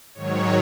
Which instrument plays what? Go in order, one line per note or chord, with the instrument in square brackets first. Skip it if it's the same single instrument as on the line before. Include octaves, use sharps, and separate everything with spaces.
[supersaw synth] G#2 D#3 F#3 C#5